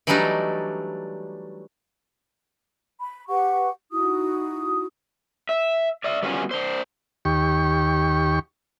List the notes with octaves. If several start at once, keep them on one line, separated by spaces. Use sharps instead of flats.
E3 F#3 G3 A3 D4 D#4
B5
G4 B4 F#5 C#6
D#4 E4 F#4 D#6
E5
D5 E5
G3 B3 C#4 F4 F#4 G#5
D4 C5
D#2 G4 C#6